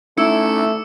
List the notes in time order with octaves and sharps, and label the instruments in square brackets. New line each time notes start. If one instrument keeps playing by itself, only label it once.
[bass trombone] A3 [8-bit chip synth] C#4 D#4 [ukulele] E4 [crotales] D6 E6 C#7